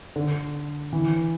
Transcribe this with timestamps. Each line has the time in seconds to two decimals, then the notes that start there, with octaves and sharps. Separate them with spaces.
0.16 D3
0.93 E3